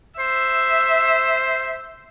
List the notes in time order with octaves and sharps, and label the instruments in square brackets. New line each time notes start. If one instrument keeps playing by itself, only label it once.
[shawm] C5 [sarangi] E5